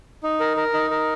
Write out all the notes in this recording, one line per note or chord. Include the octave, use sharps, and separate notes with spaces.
D#4
A#4
A#4
D#4
A#4